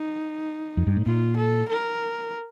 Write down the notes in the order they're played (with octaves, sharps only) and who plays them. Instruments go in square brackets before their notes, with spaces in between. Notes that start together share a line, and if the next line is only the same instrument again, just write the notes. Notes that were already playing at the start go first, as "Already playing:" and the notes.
Already playing: [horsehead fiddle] D#4
[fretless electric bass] F2
G2
A2
[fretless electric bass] A#2 [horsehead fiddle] F4
[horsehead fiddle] A4
A#4